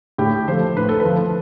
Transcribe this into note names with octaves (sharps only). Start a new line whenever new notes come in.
A2 G4
F3 A3 C5
A2 B4
A4
B4
F3 A3